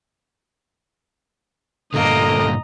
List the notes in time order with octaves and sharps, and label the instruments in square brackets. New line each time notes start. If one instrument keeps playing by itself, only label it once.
[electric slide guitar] G2 A#2 D3 [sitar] A3 A#3 [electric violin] D#5 A#5